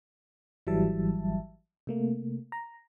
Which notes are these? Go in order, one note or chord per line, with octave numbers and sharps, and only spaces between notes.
G#1 E3 F#3 G3 E5 A5
C3 A3 A#3
A#5